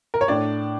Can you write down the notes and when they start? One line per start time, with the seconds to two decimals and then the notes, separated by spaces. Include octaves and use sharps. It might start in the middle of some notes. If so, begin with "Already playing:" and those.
0.14 A#4
0.21 C#5
0.28 A2 D4 D5